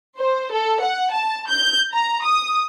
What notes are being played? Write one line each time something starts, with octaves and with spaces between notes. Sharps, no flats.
C5
A4
F#5
A5
G6
A#5
D#6